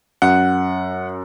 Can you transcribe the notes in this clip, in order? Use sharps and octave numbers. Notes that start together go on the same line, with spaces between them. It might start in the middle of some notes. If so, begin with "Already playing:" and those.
F#2 F#5